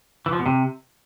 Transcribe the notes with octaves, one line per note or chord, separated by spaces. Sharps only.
E3
F3
B2
C3